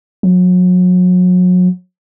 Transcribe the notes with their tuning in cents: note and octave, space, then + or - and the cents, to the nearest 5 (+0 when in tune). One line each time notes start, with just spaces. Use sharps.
F#3 -35